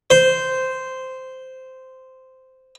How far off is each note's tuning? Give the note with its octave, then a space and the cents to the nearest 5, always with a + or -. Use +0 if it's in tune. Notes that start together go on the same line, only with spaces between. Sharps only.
C5 -10